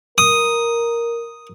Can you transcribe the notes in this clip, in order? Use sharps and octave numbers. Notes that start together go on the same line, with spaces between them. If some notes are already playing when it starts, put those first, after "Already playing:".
A#4 D#6